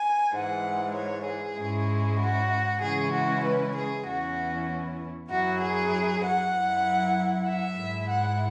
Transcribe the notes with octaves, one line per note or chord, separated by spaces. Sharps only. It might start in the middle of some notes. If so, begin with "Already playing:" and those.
Already playing: G#5
G#2 E3 G#3 F#5
C#5
G#4
G#2 G#3 C#4 E4
F#4
C#3 E3 G#3 C#4 E4 G#4
F#4
B4
G#4
E2 E3 C#4 E4 F#4
F#2 F#3 E4 F#4
G#4
F#5
F#2 F#3 E4
E5
G#2 G#3 E4
F#5